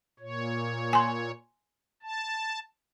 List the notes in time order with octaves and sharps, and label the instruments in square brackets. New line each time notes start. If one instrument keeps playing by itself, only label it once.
[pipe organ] A#2 C#5
[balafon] G#5 C6
[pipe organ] A5